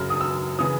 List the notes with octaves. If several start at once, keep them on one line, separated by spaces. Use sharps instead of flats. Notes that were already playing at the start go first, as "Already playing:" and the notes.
Already playing: F#2 C#3 F#3 F6
D#6
E6
C#3 E3 D#6